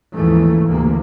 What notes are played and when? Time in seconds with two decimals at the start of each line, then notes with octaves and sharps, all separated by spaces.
0.14 D#2 G#2 C#3 E3 F3 A3
0.66 D2 C3 E3 A#3